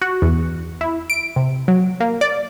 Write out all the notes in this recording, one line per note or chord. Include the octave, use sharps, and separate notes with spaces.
F#4
E2
E4
D7
C3
F#3
A#3
D5